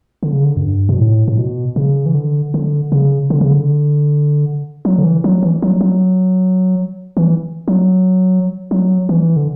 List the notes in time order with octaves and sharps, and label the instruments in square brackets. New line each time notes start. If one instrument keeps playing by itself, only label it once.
[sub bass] D3
C#3
D3
F#2
G2
B2
A2
A2
B2
C#3
E3
D3
D3
C#3
D3
C#3
D3
F#3
D3
E3
F#3
E3
F#3
F#3
E3
F#3
F#3
E3
D3